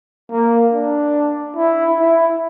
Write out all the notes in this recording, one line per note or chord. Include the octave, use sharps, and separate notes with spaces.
A#3
D4
E4
E4